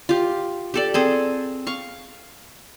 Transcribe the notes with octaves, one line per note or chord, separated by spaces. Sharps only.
F4 G4
G4 A4 D5
C4 G#4 A4
F5 C#6